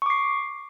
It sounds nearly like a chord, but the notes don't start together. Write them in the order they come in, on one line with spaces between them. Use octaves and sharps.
C#6 D6 C7